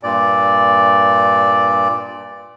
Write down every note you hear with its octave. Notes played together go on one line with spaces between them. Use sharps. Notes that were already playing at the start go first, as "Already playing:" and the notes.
G2 A#2 D5